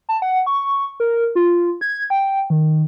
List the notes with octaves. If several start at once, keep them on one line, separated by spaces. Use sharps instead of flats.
A5
F#5
C#6
A#4
F4
G#6
G5
D#3